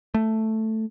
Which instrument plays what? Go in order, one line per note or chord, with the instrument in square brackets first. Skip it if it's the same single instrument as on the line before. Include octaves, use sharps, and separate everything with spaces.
[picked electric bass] A3